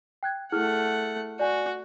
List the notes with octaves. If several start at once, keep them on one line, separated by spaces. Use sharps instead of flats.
G5 F#6 G#6
A3 E4 G#4 F#5 F6
F#4 D5 G#5